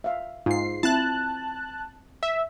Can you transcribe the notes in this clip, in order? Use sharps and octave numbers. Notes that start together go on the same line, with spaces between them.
E5 F5
G#2 F4 C7
C4 E4 A5 F#6
E5